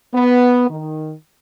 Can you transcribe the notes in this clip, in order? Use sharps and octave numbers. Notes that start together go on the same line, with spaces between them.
B3
D#3